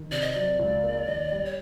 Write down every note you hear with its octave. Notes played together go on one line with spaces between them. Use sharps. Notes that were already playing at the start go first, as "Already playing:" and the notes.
Already playing: D#3
C3 D5
D#5
F#3 D5
C#2
A#3
D#2
G3
C#5